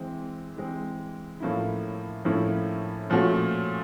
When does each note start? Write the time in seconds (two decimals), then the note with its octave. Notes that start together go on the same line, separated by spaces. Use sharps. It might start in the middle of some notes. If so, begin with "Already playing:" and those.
Already playing: E3 G#3 C4
0.57 E3 G#3 C4
1.40 A2 F3 A#3 C#4 E4
2.25 A2 F3 A#3 C#4 E4
3.10 A#2 F3 A3 C#4 F#4